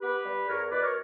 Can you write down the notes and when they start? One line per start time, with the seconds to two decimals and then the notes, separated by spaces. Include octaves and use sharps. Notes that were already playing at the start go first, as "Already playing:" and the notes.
0.02 B3 G4 B4
0.25 G3
0.48 E2 A#4 C#5
0.71 B2 B4 D5
0.82 A#4 C#5